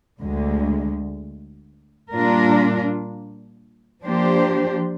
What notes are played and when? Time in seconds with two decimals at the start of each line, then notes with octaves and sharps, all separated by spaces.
0.21 D2 D3 G#3
2.11 A#2 G3 D4 F4 A#4
4.03 F3 A#3 D4 G4 C5